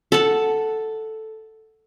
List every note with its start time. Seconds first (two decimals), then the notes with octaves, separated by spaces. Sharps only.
0.12 A4 F#5 A5